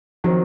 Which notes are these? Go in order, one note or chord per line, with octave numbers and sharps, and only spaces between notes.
D#3 F3 F#3 C4